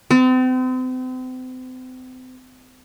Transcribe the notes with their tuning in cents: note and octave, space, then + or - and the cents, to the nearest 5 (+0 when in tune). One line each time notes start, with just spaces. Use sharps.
C4 -40